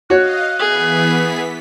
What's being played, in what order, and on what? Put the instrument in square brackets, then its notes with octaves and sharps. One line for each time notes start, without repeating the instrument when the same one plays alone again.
[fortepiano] F#4 C#5 [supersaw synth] D#5 F5 [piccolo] F#6
[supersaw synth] E3 B3 B6 [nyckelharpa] G#4